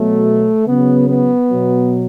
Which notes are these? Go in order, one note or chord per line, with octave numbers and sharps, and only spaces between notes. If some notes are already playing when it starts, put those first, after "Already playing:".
Already playing: B2 F#3 A3
C#3 F#3 B3
B3
B2 F#3